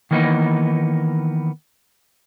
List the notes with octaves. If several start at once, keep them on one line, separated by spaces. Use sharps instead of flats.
D#3 E3 A#3 B3 D4 D#4